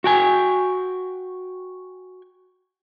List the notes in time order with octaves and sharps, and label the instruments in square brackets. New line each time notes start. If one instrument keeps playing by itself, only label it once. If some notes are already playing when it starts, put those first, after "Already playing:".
[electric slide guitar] F#4 G5 G#5